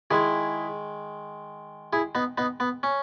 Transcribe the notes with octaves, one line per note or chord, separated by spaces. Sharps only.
D#3 G#3 E4 G#4
E4 G#4
B3 D#4
B3 D#4
B3
C#4